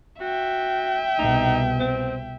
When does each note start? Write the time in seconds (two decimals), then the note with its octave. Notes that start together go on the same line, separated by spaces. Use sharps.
0.21 F#4 E5 G5
1.19 C2 B2 D#4
1.80 C4